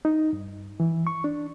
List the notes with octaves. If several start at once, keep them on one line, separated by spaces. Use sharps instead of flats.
D#4
G2
E3
C#6
D4